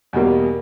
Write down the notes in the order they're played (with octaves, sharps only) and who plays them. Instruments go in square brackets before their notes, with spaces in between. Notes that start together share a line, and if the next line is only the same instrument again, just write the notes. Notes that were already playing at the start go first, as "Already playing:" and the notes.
[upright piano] E2 B2 G3 A#3